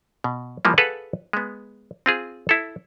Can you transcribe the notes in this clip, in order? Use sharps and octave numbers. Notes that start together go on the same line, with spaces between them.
B2
E3 F3 G3 A#3
G#4 A4 B4 F5 F#5
G#3 B3
C4 F4 G#4
E4 A4